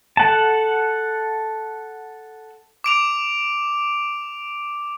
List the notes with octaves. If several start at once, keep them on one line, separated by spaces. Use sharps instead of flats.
A4 F#5 A5
D6 D7 F7